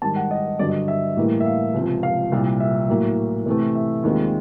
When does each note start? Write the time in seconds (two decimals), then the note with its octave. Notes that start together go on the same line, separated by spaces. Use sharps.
0.02 G#2 D#3 G3 A5
0.16 F#5
0.31 D#5
0.59 G2 D3 F#3 D5
0.69 D#5
0.88 E5
1.17 A2 E3 G3 A#3
1.40 E5
1.46 F5
1.74 C#2 C3 F3
2.03 F5
2.32 C2 A#2 G3
2.60 E5
2.89 A2 F#3 A#3
3.46 C3 E3 A3
3.75 E5
4.03 D#2 D#3 G#3 C4 F4